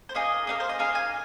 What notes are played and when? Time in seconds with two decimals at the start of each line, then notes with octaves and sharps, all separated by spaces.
0.09 C5
0.15 A#3 D#4 G#4 D#5
0.47 A#3 D#4 G#4 A#4
0.60 C5
0.69 D#5
0.79 A#3 D#4 G#4 F5
0.95 G#5